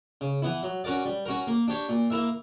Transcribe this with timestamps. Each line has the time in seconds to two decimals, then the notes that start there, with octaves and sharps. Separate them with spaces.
0.21 C#3
0.42 E3 B3 E4
0.63 F#3
0.84 C#4 F#4 A#4 D5
1.05 G3
1.26 C#4 F#4 A#4
1.47 A#3
1.68 D4 G4 C#5
1.89 A#2
2.10 A#3 E4 A#4 E5